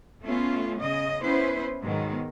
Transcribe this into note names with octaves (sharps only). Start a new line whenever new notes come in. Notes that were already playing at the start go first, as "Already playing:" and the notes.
A3 B3 C#4 F4
C#3 D#5
B3 C#4 E4 B4 C5
G#2 B2 D#3 F#3 G#3